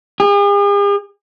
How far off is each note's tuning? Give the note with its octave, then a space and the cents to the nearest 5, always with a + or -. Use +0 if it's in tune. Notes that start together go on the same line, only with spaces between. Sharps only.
G#4 -45